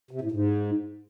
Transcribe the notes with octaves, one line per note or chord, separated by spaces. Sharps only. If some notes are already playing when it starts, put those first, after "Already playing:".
C3
A2
G#2